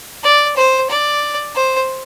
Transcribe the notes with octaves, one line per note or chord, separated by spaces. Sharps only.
D5
C5
D5
C5